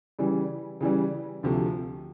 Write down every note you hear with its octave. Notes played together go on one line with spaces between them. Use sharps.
C#3 E3 G3
C#3 E3 G3
D2 C3 F3 A3